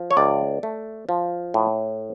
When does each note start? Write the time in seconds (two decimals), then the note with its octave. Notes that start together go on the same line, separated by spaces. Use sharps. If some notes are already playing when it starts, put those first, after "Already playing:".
Already playing: F3
0.11 C#5
0.17 C#2 D5
0.63 A3
1.09 F3
1.54 A2